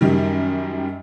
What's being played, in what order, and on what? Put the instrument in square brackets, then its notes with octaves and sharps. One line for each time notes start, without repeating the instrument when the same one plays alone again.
[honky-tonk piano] F#2 D#3 G3